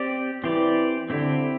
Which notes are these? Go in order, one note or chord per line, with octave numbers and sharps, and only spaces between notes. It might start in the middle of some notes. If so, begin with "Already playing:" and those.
Already playing: C4 G4 D5
E3 C4 G4 D5
D3 C4 E4 G4